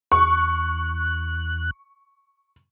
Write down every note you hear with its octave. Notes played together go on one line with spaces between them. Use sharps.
E2 C#6 F#6